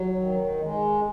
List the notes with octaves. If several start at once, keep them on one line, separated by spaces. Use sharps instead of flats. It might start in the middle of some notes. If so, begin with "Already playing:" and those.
Already playing: F#3
D#3
G#3